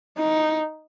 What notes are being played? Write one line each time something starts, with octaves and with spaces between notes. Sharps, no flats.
D#4